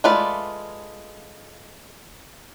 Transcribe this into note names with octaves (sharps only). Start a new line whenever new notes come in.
G#3 A3 F4 B4 D5